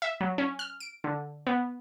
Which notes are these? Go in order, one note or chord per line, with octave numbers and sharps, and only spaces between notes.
E5
F#3
C#4
F6
D7
D3
B3